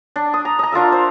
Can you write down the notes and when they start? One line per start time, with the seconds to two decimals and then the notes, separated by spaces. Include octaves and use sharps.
0.16 D4
0.34 D#6
0.45 A#5
0.59 D#5 A#5
0.72 D4 F4 A#4 E5
0.92 C5